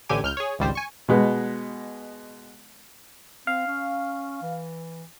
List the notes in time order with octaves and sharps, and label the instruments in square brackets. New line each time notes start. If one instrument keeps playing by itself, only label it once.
[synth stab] A1 D3 G4 G#5
C#2 F6 G6
G#4 C#5
G#1 C#2 G3 C5
G#5 C#6
[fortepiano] B2 G#3 B3
[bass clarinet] C4 [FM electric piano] F5
[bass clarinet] C#4
E3